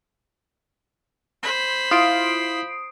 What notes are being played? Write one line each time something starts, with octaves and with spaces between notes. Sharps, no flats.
C5 B5
E4 F4 F5 D#6 C7 D7